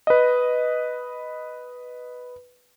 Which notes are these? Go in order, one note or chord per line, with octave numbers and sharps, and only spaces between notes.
B4 D#5